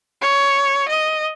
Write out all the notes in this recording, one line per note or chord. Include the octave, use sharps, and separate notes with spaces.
C#5
D#5